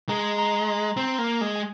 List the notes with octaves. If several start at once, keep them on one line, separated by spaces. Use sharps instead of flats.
G#3 A#5
A#5
A#5
C6
C4 A#5
A#3
G#3
G#5